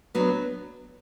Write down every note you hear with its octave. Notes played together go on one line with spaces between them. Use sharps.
F#3 B3 D4